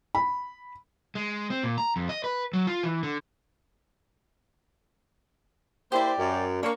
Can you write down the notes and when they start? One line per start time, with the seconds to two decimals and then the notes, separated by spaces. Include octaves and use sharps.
0.15 B5
1.15 G#3
1.50 C4
1.63 A#2
1.78 A#5
1.96 F2
2.09 D#5
2.24 B4
2.53 F#3
2.67 F4
2.83 E3
3.03 D3
5.92 A#3 E4 G4 C5 D5
6.18 F#2
6.63 A#3 D4 C#5 C#6